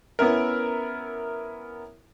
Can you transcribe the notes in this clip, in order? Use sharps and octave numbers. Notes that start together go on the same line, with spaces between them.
B3 C#4 E4 A#4